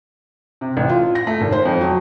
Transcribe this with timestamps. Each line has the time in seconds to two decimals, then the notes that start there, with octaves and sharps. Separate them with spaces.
0.61 C3
0.77 A1
0.89 F4
1.15 A#6
1.27 A3
1.41 G#1
1.52 C5
1.65 F2
1.81 F#3